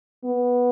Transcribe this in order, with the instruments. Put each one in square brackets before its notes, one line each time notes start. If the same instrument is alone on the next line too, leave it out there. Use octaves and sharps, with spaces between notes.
[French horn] B3